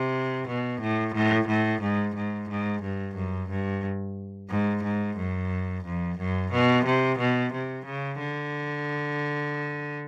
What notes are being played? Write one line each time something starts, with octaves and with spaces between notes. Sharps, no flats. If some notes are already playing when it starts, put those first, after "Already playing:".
Already playing: C3
B2
A2
A2
A2
G#2
G#2
G#2
G2
F#2
G2
G#2
G#2
F#2
F2
F#2
B2
C3
B2
C3
C#3
D3